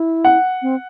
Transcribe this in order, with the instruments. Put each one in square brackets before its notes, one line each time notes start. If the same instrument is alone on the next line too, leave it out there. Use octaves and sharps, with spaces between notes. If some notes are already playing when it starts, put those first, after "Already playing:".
Already playing: [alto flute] E4
[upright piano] F#5
[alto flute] C4